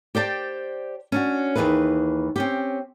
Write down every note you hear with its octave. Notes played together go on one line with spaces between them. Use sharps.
G4 C5 D5 A5
C#4 D4 F#4
D#2 C#3 E3 G#4 B4
C4 C#4 G4